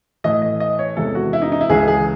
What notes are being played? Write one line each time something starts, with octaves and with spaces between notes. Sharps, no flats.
A2 E3 A3 D#5
D#5
D#5
C#5
E2 C3 E3 G#3 A4
F#4
E4
D#4
D#4
E4
C#2 C#3 E3 G#3 G#4
G#4